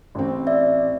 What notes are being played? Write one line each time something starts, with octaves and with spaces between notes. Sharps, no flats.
A1 C4
D5 E5